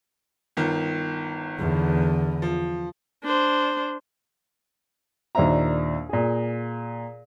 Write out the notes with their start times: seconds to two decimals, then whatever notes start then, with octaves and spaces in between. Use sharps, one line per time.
0.57 G1 D#3
1.58 E2 D3
2.42 F3
3.24 D4 C5
5.35 D#2 A#2 D4 C5 E5 A#5
6.09 A#2 G#4